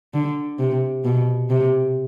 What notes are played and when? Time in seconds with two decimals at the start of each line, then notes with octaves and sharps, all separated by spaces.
0.14 D3
0.59 C3
1.04 B2
1.50 C3